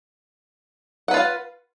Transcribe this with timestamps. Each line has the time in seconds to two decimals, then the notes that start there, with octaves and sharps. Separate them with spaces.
1.08 F#5
1.11 B4
1.14 F4
1.17 F5